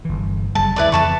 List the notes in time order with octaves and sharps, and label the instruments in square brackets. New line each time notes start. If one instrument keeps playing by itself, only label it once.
[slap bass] G1 E3
[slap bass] F#1 G3 [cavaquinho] A5
[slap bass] D2 [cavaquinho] E4 B4 D5
[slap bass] F2 C#3 E3 [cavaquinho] B4 A5 C#6